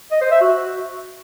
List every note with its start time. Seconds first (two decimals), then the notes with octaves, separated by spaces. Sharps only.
0.12 D#5
0.21 C5
0.31 E5
0.41 F#4